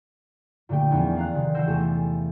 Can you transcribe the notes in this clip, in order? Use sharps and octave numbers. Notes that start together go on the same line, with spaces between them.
A#2 D3 A3 G4 G5
E2 F3 B3 C#4 D#4
D5 F5 A#5 F#6
C3 D#3
E3 C5 F#5 E6 G6 A#6
E2 C3 A3 G4 A4 G#5